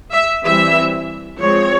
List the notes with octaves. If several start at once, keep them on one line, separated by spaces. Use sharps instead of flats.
E5
E3 G3 C4 E5
F3 G#3 C4 C#5